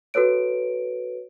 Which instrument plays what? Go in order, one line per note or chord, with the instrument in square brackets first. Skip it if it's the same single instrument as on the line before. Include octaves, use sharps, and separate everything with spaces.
[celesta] F#4 A4 B4 C#5 D7